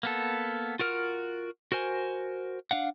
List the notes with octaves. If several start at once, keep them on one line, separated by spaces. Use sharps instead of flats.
A#3 B3 A4
F4 F#4 A#4 F6
F#4 A#4 C5 G#5
D4 F5 F#5